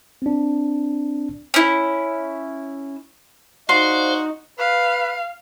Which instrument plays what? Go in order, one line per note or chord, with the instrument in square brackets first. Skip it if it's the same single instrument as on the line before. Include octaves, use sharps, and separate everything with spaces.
[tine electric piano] C4 D4
[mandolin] C#4 E4
[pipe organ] D#4 [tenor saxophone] F#4 [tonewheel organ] C5 D5 F5 [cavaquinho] C6
[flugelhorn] B4 [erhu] F5